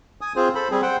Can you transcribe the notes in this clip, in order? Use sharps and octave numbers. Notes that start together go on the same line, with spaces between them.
G#5 D#6
C4 F4 G#4 C5
A4 C5 B5
G3 C4 G#4
C5 F#5 G5